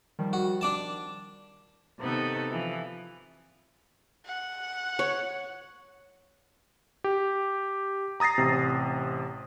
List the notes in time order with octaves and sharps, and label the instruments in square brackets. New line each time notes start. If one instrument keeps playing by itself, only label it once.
[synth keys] D#3 F3 G3
[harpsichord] F#4
D4 D5 A5
[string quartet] C3 D#3 B3 D#4 A4
E3 F3
[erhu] F#5
[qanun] C#5
[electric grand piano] G4
A#5 D#6 A6 A#6 C7
A1 C3